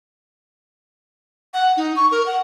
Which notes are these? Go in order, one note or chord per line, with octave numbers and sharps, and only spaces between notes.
F#5
D#4
C#6
A#4
F#5